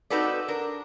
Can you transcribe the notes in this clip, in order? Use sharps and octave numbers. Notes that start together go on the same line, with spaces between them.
C4 D#4 F#4 A4 B4 D5
D4 A#4